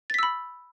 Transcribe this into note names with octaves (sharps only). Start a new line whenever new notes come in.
B5 E6 A6 B6